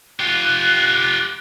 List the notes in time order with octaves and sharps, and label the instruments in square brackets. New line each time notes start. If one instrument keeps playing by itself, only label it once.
[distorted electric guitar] F4 G4 [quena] F#6